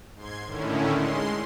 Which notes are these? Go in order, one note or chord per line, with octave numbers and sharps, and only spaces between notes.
G#2 C6 G#6
A2 D3 D#3 C#4 E4
G#3 C6